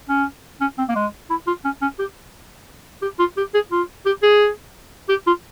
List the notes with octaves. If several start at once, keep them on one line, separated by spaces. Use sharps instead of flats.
C#4
C#4
C4
A#3
G#3
E4
F4
C#4
C#4
G4
G4
F4
G4
G#4
F4
G4
G#4
G4
F4